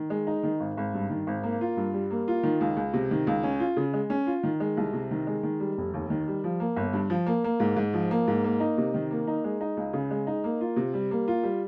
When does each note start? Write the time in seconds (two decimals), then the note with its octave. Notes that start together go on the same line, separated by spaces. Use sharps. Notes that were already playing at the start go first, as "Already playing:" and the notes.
Already playing: D#3
0.10 G#3
0.27 D#4
0.43 D#3
0.60 G#1
0.77 G#1
0.94 G2
1.10 D#3
1.27 G#1
1.43 A#3
1.61 F4
1.77 G2
1.94 G3
2.11 A#3
2.28 F4
2.43 D#3
2.61 C#2
2.77 C#2
2.94 C3
3.11 D#3
3.27 C#2
3.43 C#4
3.60 F4
3.77 C#3
3.93 G#3
4.10 C#4
4.27 F4
4.43 D#3
4.60 G#3
4.77 C2
4.93 C3
5.11 D#3
5.27 G#3
5.43 D#3
5.60 G3
5.78 F1
5.94 D#2
6.10 D#3
6.28 G3
6.44 F3
6.60 A#3
6.77 G1
6.93 G2
7.10 F3
7.27 A#3
7.44 A#3
7.60 G#2
7.77 G#2
7.94 F3
8.11 A#3
8.28 G#2
8.44 A#3
8.60 D#4
8.78 C3
8.94 D#3
9.11 A#3
9.27 D#4
9.44 G#3
9.61 D#4
9.77 C#2
9.93 C#3
10.11 G#3
10.27 D#4
10.44 A#3
10.61 F4
10.77 C3
10.94 G3
11.11 A#3
11.28 F4
11.43 G3